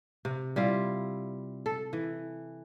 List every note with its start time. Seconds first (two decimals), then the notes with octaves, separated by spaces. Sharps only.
0.25 C3
0.56 G3 E4 F4
1.66 A4
1.93 E3